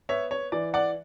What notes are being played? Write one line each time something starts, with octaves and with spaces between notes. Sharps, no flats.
B3 C#5 E5
C#5
E3 D5
D5 F#5